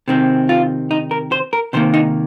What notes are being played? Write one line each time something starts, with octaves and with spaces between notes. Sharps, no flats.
C3 D#3 C4
F4
D#4
A#4
C5
A#4
C3 D#3 A#3 C5
D#4